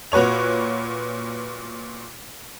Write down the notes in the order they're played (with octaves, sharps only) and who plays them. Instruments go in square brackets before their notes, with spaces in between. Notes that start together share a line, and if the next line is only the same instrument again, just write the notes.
[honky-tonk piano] A#2 F#4 B4 C#5 F7